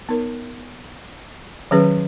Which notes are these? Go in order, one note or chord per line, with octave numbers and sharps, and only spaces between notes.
B3 D#4 A#4 C#5
D#3 F#3 C#4 G#4 B4